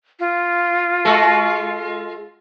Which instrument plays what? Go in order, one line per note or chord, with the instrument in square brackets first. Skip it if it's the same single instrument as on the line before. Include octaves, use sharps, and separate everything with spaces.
[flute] F4
[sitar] G#3 F#4 A4